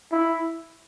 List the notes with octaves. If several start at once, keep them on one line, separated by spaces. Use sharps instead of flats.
E4